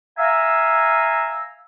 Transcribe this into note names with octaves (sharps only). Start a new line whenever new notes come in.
E5 F5 G#5 A#5 E6